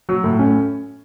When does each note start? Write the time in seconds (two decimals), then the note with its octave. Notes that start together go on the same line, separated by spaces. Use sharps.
0.09 F#3
0.24 A2
0.39 C#4